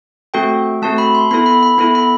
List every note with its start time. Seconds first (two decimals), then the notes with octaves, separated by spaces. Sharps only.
0.34 A3 C4 F#4 A4 G5
0.82 A3 C4 F#4 A4 A5
0.98 B5
1.15 C6
1.31 B3 E4 A4 B5
1.46 B5
1.63 B5
1.78 B3 E4 A4 B5
1.95 B5